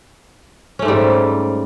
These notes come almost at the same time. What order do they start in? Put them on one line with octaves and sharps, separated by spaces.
C#4 A3 G#2 G3